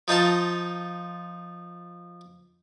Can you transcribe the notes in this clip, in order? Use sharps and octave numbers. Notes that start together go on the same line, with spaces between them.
F3 D#4 F4 A5